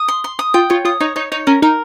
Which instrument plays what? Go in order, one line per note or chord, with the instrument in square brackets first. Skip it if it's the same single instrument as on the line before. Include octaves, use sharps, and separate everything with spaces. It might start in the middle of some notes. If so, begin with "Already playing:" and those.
Already playing: [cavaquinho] D#6
C6
C6
D#6
[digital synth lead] F4 [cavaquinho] G5
[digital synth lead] F4 [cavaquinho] C#5
[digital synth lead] F4 [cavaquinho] D#6
[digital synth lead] D#4 [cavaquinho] C#5
[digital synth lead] D#4 [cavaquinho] C#5
[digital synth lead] D#4 [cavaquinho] C#5
[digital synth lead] C#4 [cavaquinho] A#4
[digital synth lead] D#4 [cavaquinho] A#4